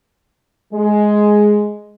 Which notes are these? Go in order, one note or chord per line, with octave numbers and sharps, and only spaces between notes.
G#3